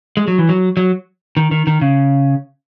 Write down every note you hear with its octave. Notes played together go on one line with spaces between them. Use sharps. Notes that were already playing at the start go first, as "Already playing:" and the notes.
G#3
F#3
E3
F#3
F#3
D#3
D#3
D#3
C#3